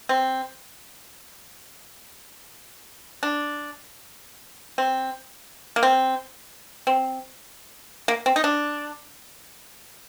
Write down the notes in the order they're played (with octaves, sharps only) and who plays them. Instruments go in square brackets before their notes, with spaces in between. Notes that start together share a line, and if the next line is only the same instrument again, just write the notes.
[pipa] C4
D4
C4
A#3
C4
C4
A#3
C4
D#4
D4